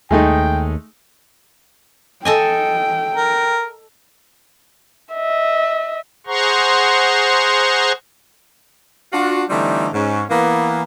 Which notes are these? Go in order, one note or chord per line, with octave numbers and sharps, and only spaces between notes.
D#2 G#3 A3 D#4 G5
A4 D#5 G5 G#5
A#4
D#5 E5
G#4 C5 F#5 A#5 C6 C#6
D4 F4 F#4
D3 E3 G3 A3 C4 D#4
G#2 C#4
E3 A#3 B3